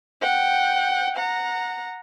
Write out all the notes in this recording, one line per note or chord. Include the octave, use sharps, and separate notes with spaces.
F#5 G5
F#5 A#5